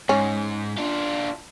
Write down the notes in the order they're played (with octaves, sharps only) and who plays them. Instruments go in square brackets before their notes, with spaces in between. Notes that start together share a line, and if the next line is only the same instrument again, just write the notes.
[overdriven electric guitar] G#2 [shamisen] C#4
[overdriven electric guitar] D4 F4